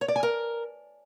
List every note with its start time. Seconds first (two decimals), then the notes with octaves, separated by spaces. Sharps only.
0.01 C#5
0.08 D5
0.16 G#5
0.23 A#4